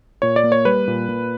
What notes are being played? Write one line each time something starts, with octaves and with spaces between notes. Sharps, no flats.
A#2 C#5
D5
A#3
C#5
G3 B4
A#2
A#2